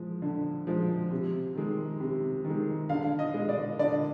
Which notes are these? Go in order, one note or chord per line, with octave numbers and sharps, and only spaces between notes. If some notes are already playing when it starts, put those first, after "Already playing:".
Already playing: F3 G#3
D3
F3 G#3
C3
D#3 G#3
C3
D#3
G#3
D3 F5
D#5
G#3
D5
D3 D5